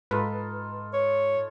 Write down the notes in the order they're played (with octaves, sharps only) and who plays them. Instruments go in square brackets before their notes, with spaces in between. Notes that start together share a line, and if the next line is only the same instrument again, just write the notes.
[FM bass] G#2 [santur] D#4 F4 A4 [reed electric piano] B4
[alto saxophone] C#5